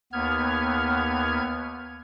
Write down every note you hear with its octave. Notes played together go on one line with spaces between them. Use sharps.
D#2 B3 F6 G#6